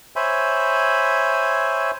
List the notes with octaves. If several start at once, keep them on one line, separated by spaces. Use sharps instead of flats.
C5 C#5 E5 G#5 B5